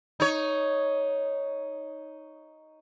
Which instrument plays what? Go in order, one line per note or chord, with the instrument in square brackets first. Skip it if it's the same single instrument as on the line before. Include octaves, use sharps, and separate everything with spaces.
[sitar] D#4 C#5